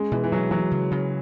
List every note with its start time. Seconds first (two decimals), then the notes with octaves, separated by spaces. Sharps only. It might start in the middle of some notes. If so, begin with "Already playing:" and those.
Already playing: G#3 C#4
0.12 B2 E3
0.24 E3
0.32 B2 F#3
0.51 E3 F#3
0.71 C#3
0.91 C#3